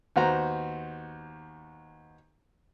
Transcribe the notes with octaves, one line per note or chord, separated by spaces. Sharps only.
D#2 B3 F#4 C5 A#5